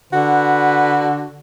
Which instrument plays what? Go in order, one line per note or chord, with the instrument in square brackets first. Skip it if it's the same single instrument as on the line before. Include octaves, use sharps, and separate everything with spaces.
[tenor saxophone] D3 [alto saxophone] F#4 [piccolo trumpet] B4